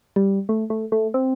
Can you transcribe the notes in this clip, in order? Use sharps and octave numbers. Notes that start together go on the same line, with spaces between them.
G3
A3
A3
A3
C4